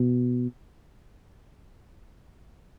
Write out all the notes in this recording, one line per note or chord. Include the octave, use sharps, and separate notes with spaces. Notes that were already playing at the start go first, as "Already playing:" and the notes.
Already playing: B2